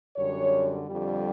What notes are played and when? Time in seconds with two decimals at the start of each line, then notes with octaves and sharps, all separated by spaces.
0.16 F#2 D3 G3 C#5
0.87 F2 D3 G3